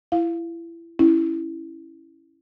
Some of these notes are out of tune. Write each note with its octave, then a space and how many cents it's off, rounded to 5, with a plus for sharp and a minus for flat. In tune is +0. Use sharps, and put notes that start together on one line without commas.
E4 +25 F5 +0
C#4 +0 E4 +0